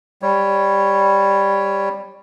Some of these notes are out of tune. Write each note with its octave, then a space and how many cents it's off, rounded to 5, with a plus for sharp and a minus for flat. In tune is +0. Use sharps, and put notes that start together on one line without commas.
G3 +10 C#5 +0